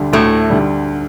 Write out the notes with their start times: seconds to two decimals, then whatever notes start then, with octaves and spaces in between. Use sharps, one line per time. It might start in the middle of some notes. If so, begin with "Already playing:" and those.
Already playing: D2 D3 G3
0.13 D2 A2 A3
0.50 D3 G3